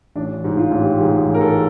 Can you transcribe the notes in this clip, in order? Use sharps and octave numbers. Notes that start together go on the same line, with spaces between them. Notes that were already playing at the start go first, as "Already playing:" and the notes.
A1 D4
G#2
F4
A1
G4
G#2 G#4
A1
A#4
A4